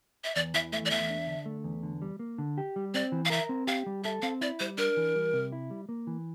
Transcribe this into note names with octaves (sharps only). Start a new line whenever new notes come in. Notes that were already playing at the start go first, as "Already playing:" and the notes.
E5
E2 D5
E3 E5
A3 E5
D5
E2 E5
D4
D3
A3
E2
D3
G3
A#3
D3
G4
G3
C4 D5
E3
F5
A#4 E5
C4
G4 F5
G3
A4 E5
C4 F5
E4 D5
G3 C5
D4 A#4
E3
G3
C3
E4
G3
A#3
E3